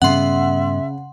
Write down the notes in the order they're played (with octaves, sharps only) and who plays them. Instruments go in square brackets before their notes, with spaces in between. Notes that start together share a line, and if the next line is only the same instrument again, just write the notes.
[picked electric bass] G2 G3 B3 [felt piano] C#3 [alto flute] E5 [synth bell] F#5 C6